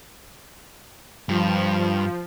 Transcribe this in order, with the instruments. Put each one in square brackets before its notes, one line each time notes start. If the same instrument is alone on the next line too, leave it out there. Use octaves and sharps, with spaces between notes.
[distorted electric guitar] G2 [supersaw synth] F3